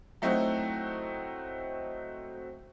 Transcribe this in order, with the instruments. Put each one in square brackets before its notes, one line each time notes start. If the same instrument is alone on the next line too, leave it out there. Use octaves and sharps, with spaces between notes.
[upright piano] F#3 A3 C4 D#4 E4 F#4